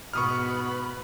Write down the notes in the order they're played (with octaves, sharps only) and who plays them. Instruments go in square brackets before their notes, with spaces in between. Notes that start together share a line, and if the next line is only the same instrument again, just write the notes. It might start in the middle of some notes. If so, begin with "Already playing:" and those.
[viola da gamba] G#2 B2 [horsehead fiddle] B3 B5 [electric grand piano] C#6 D#6 F6